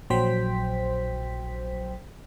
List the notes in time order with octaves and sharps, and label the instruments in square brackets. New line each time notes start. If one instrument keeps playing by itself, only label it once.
[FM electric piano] A#1 F#3 C5 G5 B6